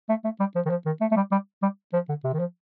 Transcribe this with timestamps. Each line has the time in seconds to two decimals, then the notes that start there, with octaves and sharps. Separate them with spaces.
0.09 A3
0.24 A3
0.39 G3
0.55 F3
0.66 D#3
0.70 F3
0.86 D#3
1.01 A3
1.11 A3
1.16 G3
1.31 G3
1.62 G3
1.93 F3
2.09 D3
2.24 C3
2.33 D#3
2.39 F3